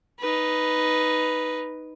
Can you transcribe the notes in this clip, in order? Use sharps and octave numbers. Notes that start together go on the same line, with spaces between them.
D#4 B4